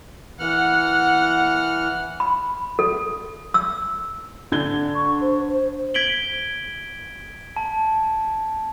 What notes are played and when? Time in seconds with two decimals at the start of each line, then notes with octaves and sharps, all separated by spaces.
0.40 E3 F#5 F6
2.20 B5
2.79 A4
3.54 E6
4.52 D3 G#6 G7
4.95 C#6
5.21 C5
5.48 C5
5.94 G#6 B6 D7 F#7 G7
7.56 A5